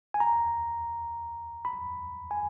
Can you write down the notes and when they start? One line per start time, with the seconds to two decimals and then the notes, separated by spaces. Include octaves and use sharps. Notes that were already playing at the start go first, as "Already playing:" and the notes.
0.14 G#5
0.20 A#5
1.65 B5
2.31 G#5